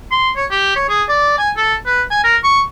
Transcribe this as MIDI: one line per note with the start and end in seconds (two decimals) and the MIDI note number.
0.11 0.30 84
0.36 0.45 73
0.51 0.75 67
0.76 0.86 73
0.89 1.03 68
1.08 1.37 74
1.38 1.49 80
1.57 1.74 69
1.86 2.02 71
2.11 2.20 80
2.24 2.37 70
2.44 2.61 85